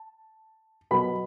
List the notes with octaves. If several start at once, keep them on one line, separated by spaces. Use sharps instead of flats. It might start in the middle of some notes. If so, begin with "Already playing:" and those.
Already playing: A5
B2 F#3 B3 B5